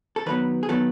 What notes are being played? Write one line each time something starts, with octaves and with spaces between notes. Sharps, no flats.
A4
D#3 F#3 B3 B4
G#4
D#3 F#3 B3 A4